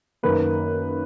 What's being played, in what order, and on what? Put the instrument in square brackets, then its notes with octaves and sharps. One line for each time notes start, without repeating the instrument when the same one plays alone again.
[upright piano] F#2 D#3 A#3 B4